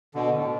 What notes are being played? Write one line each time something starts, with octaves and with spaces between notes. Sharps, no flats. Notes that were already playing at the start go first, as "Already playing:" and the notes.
B2 D3
A2